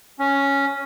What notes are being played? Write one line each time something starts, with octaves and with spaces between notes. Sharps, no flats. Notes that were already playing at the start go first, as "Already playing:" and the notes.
C#4